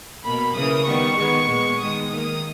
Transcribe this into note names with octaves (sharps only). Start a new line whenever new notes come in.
B2 A#3 B5
C#3 E3 A#3 D#6
D#3 G3 B3 C#6
D#3 G#3 B3
A#2 G#3 B3
D#3 G#3 B3 D#6
D#3 A#3 D#6